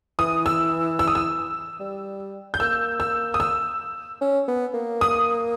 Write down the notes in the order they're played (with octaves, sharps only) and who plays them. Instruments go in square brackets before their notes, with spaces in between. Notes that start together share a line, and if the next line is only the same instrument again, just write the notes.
[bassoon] E3 [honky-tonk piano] D#6
[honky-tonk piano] E6
E6
D#6
E6
[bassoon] G3
[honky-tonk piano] G6
[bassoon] A#3 [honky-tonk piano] E6
[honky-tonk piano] E6
D#6
E6
[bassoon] C#4
B3
A#3
[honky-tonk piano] D#6